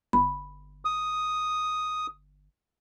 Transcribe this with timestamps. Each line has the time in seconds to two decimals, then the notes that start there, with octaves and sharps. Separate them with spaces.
0.13 G1 B5
0.85 D#6